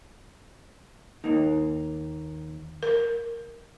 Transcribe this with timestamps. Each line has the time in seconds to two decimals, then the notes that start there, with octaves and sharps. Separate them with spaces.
1.24 D#2 A#3 D#4
2.83 A#4